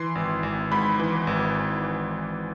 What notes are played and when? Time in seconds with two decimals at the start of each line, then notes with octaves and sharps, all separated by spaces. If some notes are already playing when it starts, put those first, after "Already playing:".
Already playing: E3 C6
0.15 G#1
0.43 G#1
0.71 G#2 B5
1.00 E3
1.27 G#1